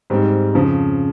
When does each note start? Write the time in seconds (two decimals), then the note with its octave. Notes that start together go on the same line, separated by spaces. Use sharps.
0.10 G#2 G3 C4
0.54 F2 C#3 F3